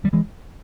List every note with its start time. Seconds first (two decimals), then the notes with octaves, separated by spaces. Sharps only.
0.04 D#3 G3
0.13 E3 G#3